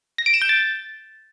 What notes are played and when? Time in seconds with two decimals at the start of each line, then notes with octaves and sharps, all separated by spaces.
0.18 A#6
0.26 D7
0.34 E7
0.42 G6
0.49 A6